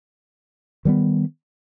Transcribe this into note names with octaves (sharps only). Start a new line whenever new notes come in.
D#3 G3 B3